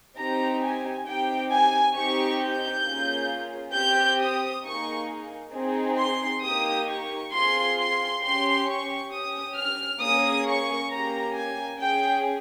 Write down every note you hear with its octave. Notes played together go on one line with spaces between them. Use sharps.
C4 D#4 G4 A#5
G#5
C4 D#4 G4 G5
G#5
C4 D#4 G4 C#6
G6
A#3 C#4 F4 G#4
C4 G4 G6
D#6
A#3 D#4 G#4 C#6
C4 D#4 G#4
C6
A#3 D#4 G4 D#6
C#6
C4 F4 G#4 C6
C6
C#4 G4 C6
C#6
C#4 G4 D#6
F6
A#3 C#4 G#4 D#6
C#6
A#3 C#4 G4 A#5
G#5
C#4 G#4 G5